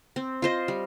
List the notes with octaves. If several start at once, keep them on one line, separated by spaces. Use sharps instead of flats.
C4
F4 C5 D#5
G3